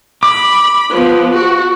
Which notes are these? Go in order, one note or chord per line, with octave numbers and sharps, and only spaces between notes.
B5 D6
F3 B3
F#4